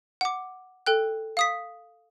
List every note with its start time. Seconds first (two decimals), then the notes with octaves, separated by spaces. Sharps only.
0.21 F#5 D6
0.86 A4 G5 F#6
1.37 F5 D#6 B6